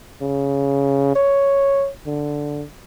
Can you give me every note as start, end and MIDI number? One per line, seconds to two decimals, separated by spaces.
0.22 1.14 49
1.15 1.89 73
2.06 2.64 50